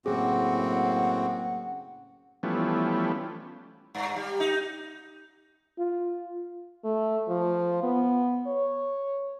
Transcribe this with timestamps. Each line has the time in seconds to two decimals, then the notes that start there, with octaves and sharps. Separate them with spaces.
0.06 F#1 A2 C4 F#4 G#4 F#5
2.43 E3 F3 G3 A3 B3 C#4
3.95 G2
4.16 G3
4.40 D#4
5.78 F4
6.84 A3
7.29 F3
7.83 B3
8.47 C#5